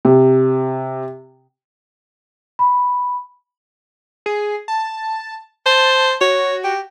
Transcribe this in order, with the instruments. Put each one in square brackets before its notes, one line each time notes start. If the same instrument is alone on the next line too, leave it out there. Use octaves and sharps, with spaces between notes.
[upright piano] C3
[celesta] B5
[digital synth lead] G#4
A5
[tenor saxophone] C5 [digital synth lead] A5
[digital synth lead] F#4 [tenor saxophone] C#5
[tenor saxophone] G4